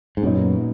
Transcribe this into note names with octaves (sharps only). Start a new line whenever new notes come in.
G#2
F#2 A#2 F#3 B3 D#4